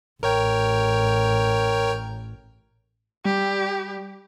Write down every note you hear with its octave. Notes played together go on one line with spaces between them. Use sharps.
A1 A#4 C#5 G5
G3 G4